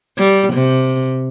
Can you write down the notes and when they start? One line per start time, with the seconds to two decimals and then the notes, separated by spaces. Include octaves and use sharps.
0.18 G3
0.54 C3